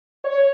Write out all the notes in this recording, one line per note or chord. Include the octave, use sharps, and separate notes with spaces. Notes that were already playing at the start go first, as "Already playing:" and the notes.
C#5